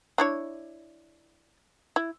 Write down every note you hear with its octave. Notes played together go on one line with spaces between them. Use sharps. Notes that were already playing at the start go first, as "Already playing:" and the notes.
D4 E4 C#5
E4